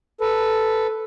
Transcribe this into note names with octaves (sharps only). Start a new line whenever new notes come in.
A4 B4